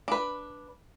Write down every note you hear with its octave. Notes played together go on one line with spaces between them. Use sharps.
D4 B4